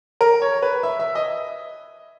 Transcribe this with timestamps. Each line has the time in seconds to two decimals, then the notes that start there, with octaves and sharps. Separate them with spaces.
0.21 A#4
0.42 C#5
0.62 B4
0.83 E5
0.99 E5
1.15 D#5